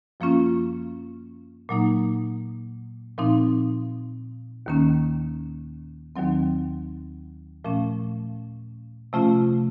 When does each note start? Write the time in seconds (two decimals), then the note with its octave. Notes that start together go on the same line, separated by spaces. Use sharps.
0.20 F#2 F3 A#3 C#4 F4
1.69 A#2 F#3 A#3 D#4
3.18 A#2 F3 C4 D#4
4.66 D#2 D#3 A#3 C#4
6.16 D#2 D#3 F#3 C4
7.64 A#2 F3 A3 C#4
9.13 C3 F3 A3 C#4 F4